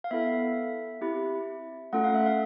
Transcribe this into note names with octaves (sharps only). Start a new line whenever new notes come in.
F5
B3 E4 A4 E5
C4 E4 G4
A3 C#4 F4 A4 F#5
F5
E5
F5